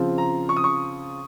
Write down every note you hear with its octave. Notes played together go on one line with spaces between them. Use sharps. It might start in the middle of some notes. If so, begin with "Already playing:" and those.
Already playing: C#3 F3 C4 F4
A#5
C#6
D#6
C#6